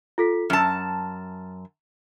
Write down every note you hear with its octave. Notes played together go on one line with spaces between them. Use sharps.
F4 A4 B6
F#2 A5 F6 A6